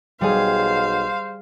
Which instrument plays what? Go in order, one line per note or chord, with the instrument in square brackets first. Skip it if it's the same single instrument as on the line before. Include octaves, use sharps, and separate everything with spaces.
[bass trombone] B1 [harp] G3 G#4 [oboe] C5 [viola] F5